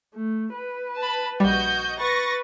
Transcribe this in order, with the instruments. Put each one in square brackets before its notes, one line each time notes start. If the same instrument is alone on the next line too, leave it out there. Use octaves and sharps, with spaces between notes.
[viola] A3
B4
[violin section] A5 B5
[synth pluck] A#1 G3 [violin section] F#4 D#5 G6
[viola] B4 [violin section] C#6 A6 A#6